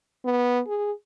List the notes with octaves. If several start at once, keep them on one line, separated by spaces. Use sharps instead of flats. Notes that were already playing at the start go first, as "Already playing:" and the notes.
B3
G#4